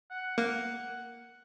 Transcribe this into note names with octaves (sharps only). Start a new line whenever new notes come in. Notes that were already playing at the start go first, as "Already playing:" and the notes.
F#5
A#3 F#5